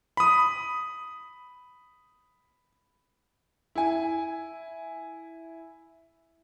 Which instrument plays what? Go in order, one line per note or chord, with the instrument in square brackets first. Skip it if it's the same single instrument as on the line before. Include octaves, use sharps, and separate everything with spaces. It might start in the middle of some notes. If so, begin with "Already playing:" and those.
[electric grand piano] B5 D#6
[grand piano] E4 G#5